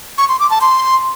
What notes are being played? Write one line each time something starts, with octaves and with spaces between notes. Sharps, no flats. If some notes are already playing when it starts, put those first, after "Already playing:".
C#6
C6
D6
A5
C6